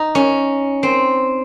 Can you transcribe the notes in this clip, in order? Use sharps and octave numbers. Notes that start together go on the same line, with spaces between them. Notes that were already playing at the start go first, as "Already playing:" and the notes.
Already playing: D#4
C#4
C4